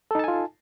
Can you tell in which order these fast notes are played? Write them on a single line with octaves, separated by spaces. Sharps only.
A4 D#4 A5 G#5 F4